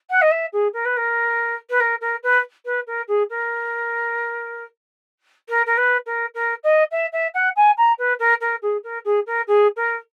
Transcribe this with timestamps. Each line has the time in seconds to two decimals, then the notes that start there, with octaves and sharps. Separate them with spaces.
0.10 F#5
0.22 D#5
0.31 E5
0.53 G#4
0.73 A#4
0.85 B4
0.97 A#4
1.70 B4
1.80 A#4
2.01 A#4
2.23 B4
2.65 B4
2.87 A#4
3.08 G#4
3.30 A#4
5.49 A#4
5.66 A#4
5.77 B4
6.06 A#4
6.35 A#4
6.64 D#5
6.92 E5
7.13 E5
7.34 F#5
7.56 G#5
7.78 A#5
7.99 B4
8.19 A#4
8.41 A#4
8.62 G#4
8.84 A#4
9.05 G#4
9.27 A#4
9.48 G#4
9.76 A#4